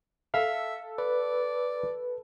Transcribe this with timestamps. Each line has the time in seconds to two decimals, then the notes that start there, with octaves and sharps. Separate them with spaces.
0.34 A4 E5 F5
0.98 B4 D5